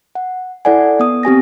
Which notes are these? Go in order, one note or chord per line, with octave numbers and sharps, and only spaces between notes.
F#5
E4 A4 D5 F#5 G#5
B3 D#6
C4 G4 G#5 A#6